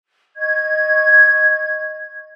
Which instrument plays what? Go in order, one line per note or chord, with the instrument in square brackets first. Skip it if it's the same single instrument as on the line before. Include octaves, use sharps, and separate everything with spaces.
[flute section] D#5 C#6 G#6